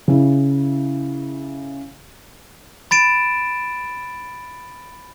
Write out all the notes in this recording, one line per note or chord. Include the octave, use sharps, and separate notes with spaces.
C#3 E4
B5 A6 D7 E7